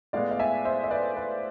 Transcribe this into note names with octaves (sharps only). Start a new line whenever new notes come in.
A2 G#3 B3 D5 F5
F5
E5 G#5
C5 E5
E5
B4 D5
B4